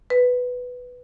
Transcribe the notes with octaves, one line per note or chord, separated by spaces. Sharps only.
B4